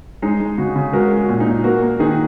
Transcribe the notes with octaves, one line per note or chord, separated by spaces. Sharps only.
G#3 D#4
G#3
C#3 F#4
C#3
G#3 F#4 A#4
G#3
F#4
A#2
D#4
A#2
A#3 F#4 A#4
A#3
D#3 D#4 G#4